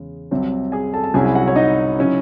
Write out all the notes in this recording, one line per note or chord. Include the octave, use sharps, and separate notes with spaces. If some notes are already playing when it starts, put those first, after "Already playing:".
Already playing: E2 C#3 G#3
C2 C3 F#3
G#4 G#5
A4 A5
A5
C2 C3 F#3 C#4 E4 G#4 G#5
G#5
F#4 F#5
C#5
D#4 D#5
C#3 F#3 C#4 E4